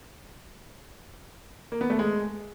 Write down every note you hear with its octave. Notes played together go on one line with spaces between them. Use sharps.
A#3
B3
A3
G#3